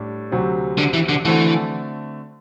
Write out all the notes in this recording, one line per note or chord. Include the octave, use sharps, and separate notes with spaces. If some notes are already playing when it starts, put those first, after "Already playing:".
Already playing: A2 G3 D4
D2 C3 F#3 C4
D3
E3
D3
D3 E3 A3 C4 F#4